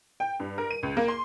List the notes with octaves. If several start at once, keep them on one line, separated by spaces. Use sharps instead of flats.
G5
G2
A#4
D#7
C#2
A#3
C6